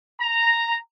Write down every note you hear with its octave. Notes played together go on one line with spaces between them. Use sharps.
A#5